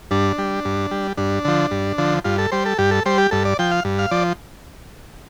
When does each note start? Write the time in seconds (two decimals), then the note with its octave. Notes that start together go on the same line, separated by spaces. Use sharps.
0.11 G2 D4
0.38 G3
0.65 G2
0.91 G3
1.17 G2 D4
1.45 D3 F3
1.71 G2
1.98 D3 F3
2.25 G2 F4
2.38 A4
2.52 G3 C5
2.66 A4
2.78 G2 G4
2.91 A4
3.06 G3 C5
3.18 G4
3.31 G2 A4
3.45 D5
3.59 F3 G5
3.71 F5
3.85 G2
3.99 F5
4.11 F3 D5